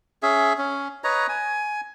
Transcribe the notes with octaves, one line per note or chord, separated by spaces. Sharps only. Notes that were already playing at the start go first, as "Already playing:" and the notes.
C#4 G#4 E5
C#4
B4 C#5 D#5 A#5
G#5